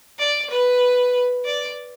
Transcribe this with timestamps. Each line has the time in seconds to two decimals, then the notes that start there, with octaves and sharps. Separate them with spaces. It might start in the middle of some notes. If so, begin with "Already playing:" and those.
0.19 D5
0.49 B4
1.45 D5